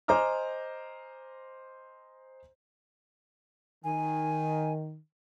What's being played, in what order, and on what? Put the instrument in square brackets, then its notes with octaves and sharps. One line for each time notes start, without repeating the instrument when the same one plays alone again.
[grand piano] C5 D#5 G#5 A#5 D6 F6
[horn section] D#3 [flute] G#5